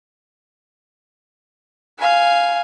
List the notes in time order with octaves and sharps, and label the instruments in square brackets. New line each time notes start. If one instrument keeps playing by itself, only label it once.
[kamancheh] F5 G#5